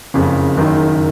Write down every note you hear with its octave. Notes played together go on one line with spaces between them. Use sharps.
F#1 F2 C#3
F#1 F#2 D#3